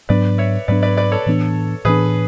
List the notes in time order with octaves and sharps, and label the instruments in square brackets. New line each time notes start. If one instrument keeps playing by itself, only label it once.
[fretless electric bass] G#2 F#3 B3 D4 [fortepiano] B4 D5
[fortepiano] C#5 E5
[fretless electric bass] G#2 F#3 B3 D4 [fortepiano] B4 D5
[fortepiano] B4 D5
B4 D5
A4 C#5
[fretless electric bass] A2 E3 B3 D4
[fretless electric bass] A2 E3 B3 D4 [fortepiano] G#4 B4